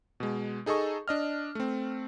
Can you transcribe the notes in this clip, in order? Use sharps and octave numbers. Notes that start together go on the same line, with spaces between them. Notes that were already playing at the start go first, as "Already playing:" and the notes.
B2 G#3
D#4 G#4 A4 D#5 C#6
D4 D#5 F6
A3 C4